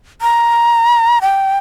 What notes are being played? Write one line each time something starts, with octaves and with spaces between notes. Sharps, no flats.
A#5
G5